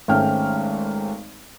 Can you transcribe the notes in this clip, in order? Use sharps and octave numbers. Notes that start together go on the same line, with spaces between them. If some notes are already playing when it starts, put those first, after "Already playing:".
G#1 G#2 A3 C#4 G5 F6